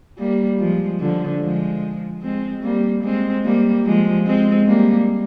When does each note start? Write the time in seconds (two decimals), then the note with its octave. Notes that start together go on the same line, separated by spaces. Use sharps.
0.18 G3 A#3
0.59 F3 G#3
1.00 D3 F3
1.41 F3 G#3
2.22 G#3 C4
2.63 G3 A#3
3.03 G#3 C4
3.44 G3 A#3
3.85 F3 G#3
4.26 G#3 C4
4.67 G3 A#3